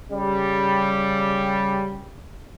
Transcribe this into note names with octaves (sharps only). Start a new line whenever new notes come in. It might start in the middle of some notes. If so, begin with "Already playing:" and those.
C#3 G3